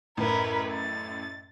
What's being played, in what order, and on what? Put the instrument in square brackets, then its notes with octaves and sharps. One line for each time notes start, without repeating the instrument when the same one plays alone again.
[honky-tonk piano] A1 F#2 A2 [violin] A#4 B4
[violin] A6